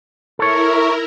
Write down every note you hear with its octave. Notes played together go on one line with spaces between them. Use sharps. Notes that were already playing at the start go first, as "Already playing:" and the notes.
E4 A4 A#4 C#5